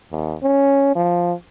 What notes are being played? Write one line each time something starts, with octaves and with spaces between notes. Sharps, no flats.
D#2
C#4
F3